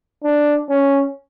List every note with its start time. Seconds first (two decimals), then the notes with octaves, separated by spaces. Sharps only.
0.23 D4
0.69 C#4